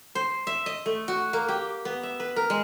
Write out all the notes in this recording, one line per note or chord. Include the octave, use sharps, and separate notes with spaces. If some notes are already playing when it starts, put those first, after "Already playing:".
C5
E5
D#5
A3
F#4
A#3
G4
B3
E5
B4
A#4
G#3